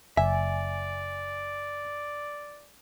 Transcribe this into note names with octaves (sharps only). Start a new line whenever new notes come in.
F#1 D5 E5 G#5